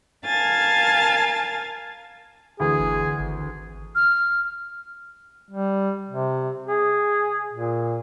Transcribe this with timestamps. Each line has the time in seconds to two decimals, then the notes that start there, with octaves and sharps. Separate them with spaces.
0.24 A#4 F5 G#5 A5 A6
2.60 D2 E3 G#4
2.79 G1
3.19 G#1
3.95 F6
5.50 G3
6.08 C3
6.66 G#4
7.52 A#2